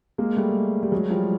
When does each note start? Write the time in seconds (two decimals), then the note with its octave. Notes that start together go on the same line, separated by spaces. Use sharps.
0.18 G#3 A#3
0.36 G3 A3
0.83 G3
0.92 F#3 G#3
1.10 F3 G3